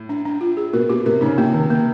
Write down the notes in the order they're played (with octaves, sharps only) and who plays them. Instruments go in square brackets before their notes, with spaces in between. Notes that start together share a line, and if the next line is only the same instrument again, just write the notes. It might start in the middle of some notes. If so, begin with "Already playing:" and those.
Already playing: [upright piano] A2
[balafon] D4
D4
F4
G#4
[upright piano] B2 [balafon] A#4
[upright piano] B2 [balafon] G4
[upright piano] C3 [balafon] A#4
[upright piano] C#3 [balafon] D#4
[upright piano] C3 [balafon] A#3
[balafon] D#3
A#3